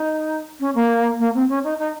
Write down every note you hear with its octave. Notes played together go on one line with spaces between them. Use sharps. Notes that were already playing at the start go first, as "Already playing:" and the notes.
Already playing: D#4
C#4
A#3
A#3
C4
C#4
D#4
D#4